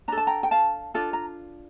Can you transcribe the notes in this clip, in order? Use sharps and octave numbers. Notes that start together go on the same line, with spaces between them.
D4 A4 A#5
A5
G5 A#5
G5
F5 A5
D4 F4 A4
A#5